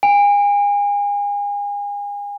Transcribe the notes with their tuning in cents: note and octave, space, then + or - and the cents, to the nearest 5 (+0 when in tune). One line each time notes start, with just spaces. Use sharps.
G#5 -35